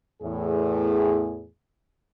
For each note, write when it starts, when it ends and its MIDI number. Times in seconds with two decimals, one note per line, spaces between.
0.22 1.47 40
0.22 1.47 45
0.22 1.47 68